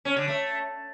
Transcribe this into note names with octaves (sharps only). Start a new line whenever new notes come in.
C#4
D3
A3